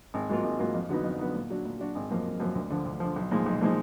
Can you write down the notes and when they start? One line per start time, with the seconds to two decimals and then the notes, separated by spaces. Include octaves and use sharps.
0.14 G#1
0.29 G#2 F#3 A#3 F4
0.44 G#1
0.59 G#2 F#3 A#3 F4
0.74 F2
0.89 D3 F#3 B3 D#4
1.04 F2
1.19 D3 F#3 B3 D#4
1.35 A#2
1.50 F#3 D4 F#4
1.65 A#2
1.79 F#3 D4 F#4
1.95 G#1
2.10 F#2 F3 A#3
2.26 G#1
2.40 F#2 F3 A#3
2.55 D2
2.70 D3 F3
2.85 D2
3.00 D3 F3
3.16 B1
3.31 A#2 F3 G#3 D#4
3.46 B1
3.61 A#2 F3 G#3 D#4